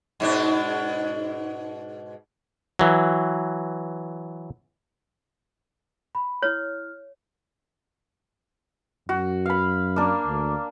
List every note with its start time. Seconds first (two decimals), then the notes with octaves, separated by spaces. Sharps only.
0.20 G#2 B2 D4
2.79 E3 F#3
6.15 B5
6.42 E4 C#5 F6
9.09 F#2 F#4
9.46 F5 B5
9.96 A#3 D4
10.27 D2